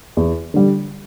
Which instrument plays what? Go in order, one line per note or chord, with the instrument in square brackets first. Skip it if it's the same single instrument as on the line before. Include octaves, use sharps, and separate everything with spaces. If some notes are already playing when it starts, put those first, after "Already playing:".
[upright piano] E2
D3 G3